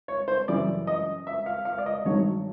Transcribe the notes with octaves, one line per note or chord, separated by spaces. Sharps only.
C#5
C5
F#2 C#3 E3 G3 D5
D#5
E5
F5
F5
D5
D#5
G#1 G2 D#3 F#3 C#5